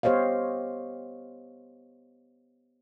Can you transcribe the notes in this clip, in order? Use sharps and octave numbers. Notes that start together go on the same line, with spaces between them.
B3 G4 C5 C#5 D#5 F5